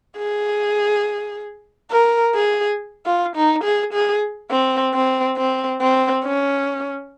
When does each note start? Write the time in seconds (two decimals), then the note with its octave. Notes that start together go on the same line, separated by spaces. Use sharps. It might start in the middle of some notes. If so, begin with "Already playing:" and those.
0.17 G#4
1.91 A#4
2.34 G#4
3.06 F4
3.36 D#4
3.64 G#4
3.93 G#4
4.51 C4
4.94 C4
5.37 C4
5.81 C4
6.24 C#4